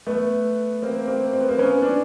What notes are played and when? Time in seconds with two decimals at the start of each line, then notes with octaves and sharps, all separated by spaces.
0.07 A3 B3
0.82 A#3 C4
1.08 A#3 C4
1.33 C4
1.40 B3
1.49 A#3 C4
1.59 B3 C#4
1.82 D4